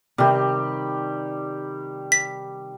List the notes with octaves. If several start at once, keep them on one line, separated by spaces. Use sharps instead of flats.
C3 D#3 G3 G4
B6